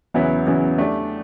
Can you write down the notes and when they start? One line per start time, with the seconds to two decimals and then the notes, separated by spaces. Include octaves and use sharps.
0.14 E2 C#3 F#3 B3 E4
0.47 E2 C#3 F#3 B3 E4
0.78 A3 D4 G4 D5